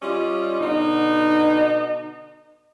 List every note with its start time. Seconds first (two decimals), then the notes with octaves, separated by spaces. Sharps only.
0.02 G3 C#4 F4 D5 D#5
0.60 B2 D3 D#4